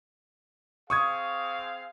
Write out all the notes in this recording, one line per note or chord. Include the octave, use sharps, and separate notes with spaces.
C4 G#4 F5 C#6 D#6 G#6